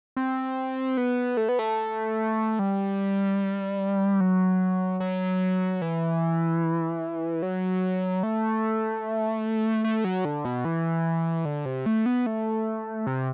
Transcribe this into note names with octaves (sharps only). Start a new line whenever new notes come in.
C4
B3
A3
B3
A3
G3
F#3
F#3
E3
F#3
A3
A3
F#3
D3
B2
E3
D3
C3
A3
B3
A3
C3